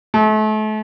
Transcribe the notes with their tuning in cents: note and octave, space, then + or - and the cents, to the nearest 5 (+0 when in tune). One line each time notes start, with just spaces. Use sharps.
A3 -35